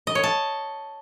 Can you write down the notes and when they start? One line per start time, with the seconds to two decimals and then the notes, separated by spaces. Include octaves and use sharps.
0.07 D#5
0.15 C#5
0.24 A5